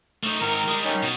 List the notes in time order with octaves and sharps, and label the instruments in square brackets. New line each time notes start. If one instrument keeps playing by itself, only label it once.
[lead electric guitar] A3 D#4
[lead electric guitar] G#2 D#3 [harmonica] A#4
[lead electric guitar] G3 G#3
[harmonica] D#3 C#4 D#4
[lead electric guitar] B2